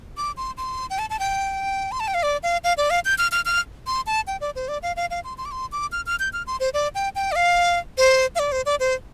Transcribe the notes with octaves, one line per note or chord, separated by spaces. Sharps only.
D6
C6
C6
G5
A5
A5
G5
C6
A5
G5
F5
D5
F5
F5
D5
F5
G6
F6
F6
F6
C6
A5
G5
D5
C5
D5
F5
F5
F5
C6
C6
D6
C6
D6
F6
F6
G6
F6
C6
C5
D5
G5
G5
D5
F5
C5
F5
D5
C5
D5
C5